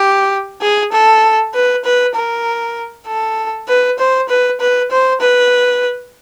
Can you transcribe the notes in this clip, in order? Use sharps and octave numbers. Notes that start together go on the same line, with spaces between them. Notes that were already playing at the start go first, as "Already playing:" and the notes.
Already playing: G4
G#4
A4
B4
B4
A#4
A4
B4
C5
B4
B4
C5
B4